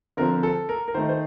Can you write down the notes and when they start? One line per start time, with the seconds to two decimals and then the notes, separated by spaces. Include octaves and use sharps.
0.17 D3 F3 C4 A#4
0.43 A4
0.69 A#4
0.88 A#4
0.94 D#3 A3 D#4 C5
1.09 C5